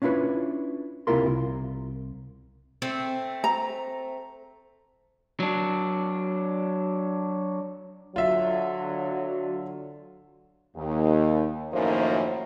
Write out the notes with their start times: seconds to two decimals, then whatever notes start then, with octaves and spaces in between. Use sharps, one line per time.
0.02 C#4 D4 E4 F4 B4 C#5
1.07 C#2 C3 E4 F4 A#4 C6
1.27 C2
2.82 A3 C4
3.44 A#5
5.40 F#3 D4
8.16 D3 F#3 F4 E5
10.76 D#2
11.72 F#2 A2 D#3 F3 A#3 C5